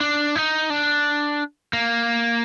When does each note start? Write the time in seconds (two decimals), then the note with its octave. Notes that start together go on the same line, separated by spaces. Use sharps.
0.01 D4
0.36 D#4
0.70 D4
1.73 A#3